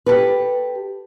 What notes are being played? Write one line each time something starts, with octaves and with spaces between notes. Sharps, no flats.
G4 A4 B4